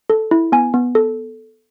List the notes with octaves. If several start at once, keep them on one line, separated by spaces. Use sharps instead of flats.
A4
E4
B3 G#5
B3
A4